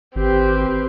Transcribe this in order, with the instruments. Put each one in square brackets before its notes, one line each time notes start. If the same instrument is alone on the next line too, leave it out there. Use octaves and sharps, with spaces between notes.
[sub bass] G#1 [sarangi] C4 [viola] G4 B4